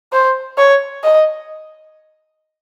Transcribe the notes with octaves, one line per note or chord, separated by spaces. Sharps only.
C5
C#5
D#5